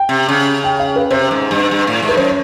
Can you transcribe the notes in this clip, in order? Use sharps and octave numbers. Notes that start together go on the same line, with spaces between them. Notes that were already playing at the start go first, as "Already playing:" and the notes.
Already playing: G5
C3
C#3
G5
F5
B4
C3 C5
G#2
G2
G2
A2
G#2
B4
F#2 C5
C#5